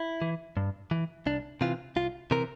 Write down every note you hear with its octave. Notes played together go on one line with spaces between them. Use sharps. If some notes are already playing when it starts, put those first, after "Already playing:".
Already playing: E4
E3
G2
E3
C2 D4
C3 E3 F4
C2 F4
C3 E3 A#4